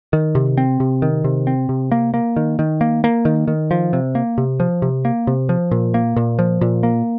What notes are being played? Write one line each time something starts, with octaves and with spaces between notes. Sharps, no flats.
D#3
C3
C4
C3
D#3
C3
C4
C3
A#3
A#3
D#3
D#3
A#3
A#3
D#3
D#3
F3
C3
A#3
C3
F3
C3
A#3
C3
F3
A#2
A#3
A#2
F3
A#2
A#3